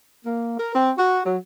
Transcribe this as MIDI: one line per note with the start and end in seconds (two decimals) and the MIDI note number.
0.25 0.56 58
0.58 0.72 70
0.74 0.91 60
0.98 1.20 66
1.25 1.37 54